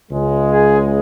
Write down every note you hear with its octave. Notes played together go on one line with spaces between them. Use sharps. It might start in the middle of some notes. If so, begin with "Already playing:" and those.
C#2 C#3 G#3
G#4